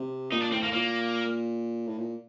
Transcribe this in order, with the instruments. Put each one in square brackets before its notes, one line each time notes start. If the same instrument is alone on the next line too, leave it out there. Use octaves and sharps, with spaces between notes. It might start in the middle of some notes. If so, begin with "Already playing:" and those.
Already playing: [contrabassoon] C3
[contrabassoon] A#2 [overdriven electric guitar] D#4
[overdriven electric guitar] D4
[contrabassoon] A2 [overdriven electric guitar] C4
[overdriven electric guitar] A#3
[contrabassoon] A#2 [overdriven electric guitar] A#3
[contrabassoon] A2
A#2